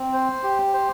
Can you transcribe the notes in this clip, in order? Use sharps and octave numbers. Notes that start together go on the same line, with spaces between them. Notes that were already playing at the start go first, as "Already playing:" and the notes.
Already playing: C4
C5
G4
C5